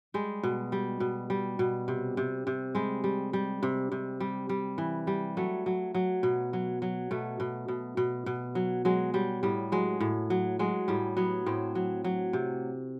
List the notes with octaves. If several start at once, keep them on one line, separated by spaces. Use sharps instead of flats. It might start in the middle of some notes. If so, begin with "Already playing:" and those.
G3 G#3
B2
G3
B2
G3
B2
C3
C3
C3
G3 G#3
G3
G3
C3
C3
G3
G3
E3
G3
F#3 A3
F#3
F#3
B2
F#3
F#3
B2 A3
B2
B2
B2
B2
F#3
F#3 G#3
F#3 G3
A2 G3
F#3 G#3
A2
F#3
F#3 G#3
A2 G3
F#3 B3
A2 C4
F#3
F#3
C3